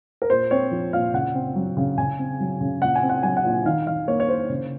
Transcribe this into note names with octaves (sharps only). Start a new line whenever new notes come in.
A#4
A#2 C5
C4 C#5
F3
A#2 F5
C#3 F#5
C4
F#3
C#3
C#3 G#5
C4
F#3
C#3
A#2 F#5
G#5
C4
F#5
F#3 G#5
F#5
A#2
D#3 F5
D#3 F5
A#3 C#5
C#5
A#3 C5
C#3